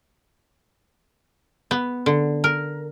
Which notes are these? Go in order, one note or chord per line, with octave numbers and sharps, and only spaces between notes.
B3
D3
A#4